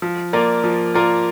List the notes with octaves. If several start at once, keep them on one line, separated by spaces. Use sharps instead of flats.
F3
A#3 F4 A#4 D5
F3
A#3 F4 A#4 D5